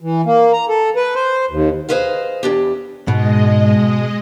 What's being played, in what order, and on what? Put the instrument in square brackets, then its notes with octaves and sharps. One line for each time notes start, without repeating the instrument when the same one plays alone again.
[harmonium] E3
A#3
A#5
A4
B4
C5
D#2
[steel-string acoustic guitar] G#4 B4 C5 D#5 F5
E2 D4 G4
[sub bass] G#2 [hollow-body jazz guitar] B2 [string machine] G#3 D#5